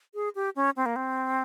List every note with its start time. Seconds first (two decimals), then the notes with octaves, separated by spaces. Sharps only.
0.14 G#4
0.35 G4
0.56 C#4
0.76 C4
0.86 A#3
0.96 C4